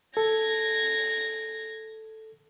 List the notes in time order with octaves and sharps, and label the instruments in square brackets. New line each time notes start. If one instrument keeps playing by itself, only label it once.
[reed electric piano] A4 [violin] G#6 A#6